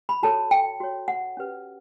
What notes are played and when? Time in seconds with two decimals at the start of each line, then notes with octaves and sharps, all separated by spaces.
0.09 B5
0.23 F#4 A4 C#5 A5
0.51 G5
0.80 F#4 C#5
1.08 F#5
1.37 C#4 G4 B4